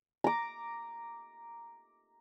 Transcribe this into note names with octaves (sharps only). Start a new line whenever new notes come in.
A#5 D6